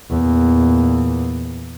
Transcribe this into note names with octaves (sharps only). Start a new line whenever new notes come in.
E2 A#2